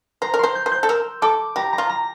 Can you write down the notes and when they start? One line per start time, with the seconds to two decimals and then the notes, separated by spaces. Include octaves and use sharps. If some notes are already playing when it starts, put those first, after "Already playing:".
0.22 C5 A#5
0.34 A#4
0.39 C5 C6
0.55 G6
0.66 C5
0.72 G6
0.83 A4
0.88 A#4 E6
1.22 A4 D6
1.56 G4 A#5
1.73 A#5
1.78 F4
1.89 A#5